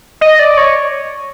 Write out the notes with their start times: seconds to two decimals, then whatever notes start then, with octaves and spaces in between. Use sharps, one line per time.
0.21 D#5
0.39 D5
0.57 C#5